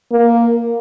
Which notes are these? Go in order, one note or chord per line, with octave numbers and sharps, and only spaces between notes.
A#3